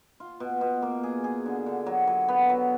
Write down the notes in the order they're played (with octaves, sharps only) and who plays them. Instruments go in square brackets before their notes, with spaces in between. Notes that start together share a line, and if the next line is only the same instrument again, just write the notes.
[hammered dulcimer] F4
B2
B2
A#3
G#4
G#4
D3
D3
F#3
F#3
B3
F#3